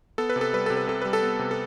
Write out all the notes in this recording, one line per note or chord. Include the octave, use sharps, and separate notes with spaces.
B3 A4
B4
C3
A4
G3 B4
C3 A4
B4
C3 A4
G3 B4
A4
B3
C3
A4